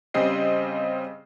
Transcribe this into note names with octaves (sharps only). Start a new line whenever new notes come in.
C#3 G3 C4 D#5 C7